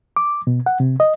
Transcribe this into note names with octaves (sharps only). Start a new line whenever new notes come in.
D6
B2
F#5
C3
D#5